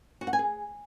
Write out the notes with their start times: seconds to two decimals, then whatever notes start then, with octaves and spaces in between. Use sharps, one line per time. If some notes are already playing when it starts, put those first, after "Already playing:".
0.21 F#4
0.27 F#5
0.33 G#5
0.39 G#4